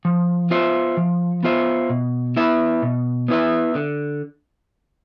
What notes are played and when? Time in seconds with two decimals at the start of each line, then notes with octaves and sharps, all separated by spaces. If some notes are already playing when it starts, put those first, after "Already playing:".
0.05 F3
0.50 B3 F4 C5 E5
0.97 F3
1.43 B3 F4 C5 E5
1.90 B2
2.36 B3 E4 B4 E5
2.82 B2
3.28 B3 E4 B4 E5
3.75 D3